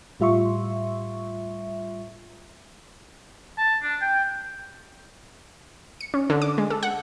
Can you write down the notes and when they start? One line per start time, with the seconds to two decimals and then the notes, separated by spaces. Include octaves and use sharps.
0.20 A2 G3 F4 E5 C6 C#6
3.58 A5
3.83 D4
4.01 G5
6.01 C#7
6.14 C#4
6.30 D3
6.42 D6
6.58 G#3
6.70 A4
6.83 F#5